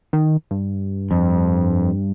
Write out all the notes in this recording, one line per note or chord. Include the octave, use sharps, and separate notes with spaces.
D#3
G2
F2